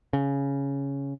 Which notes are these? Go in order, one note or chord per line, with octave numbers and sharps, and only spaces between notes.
C#3